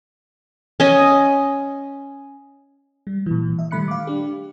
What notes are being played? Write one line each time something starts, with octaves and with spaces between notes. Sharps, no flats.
C#4 D#5
G3
A#2 E3
D#5 E5
D#3 G3 A3 B5 F#6 C#7
F5 D6
D4 G4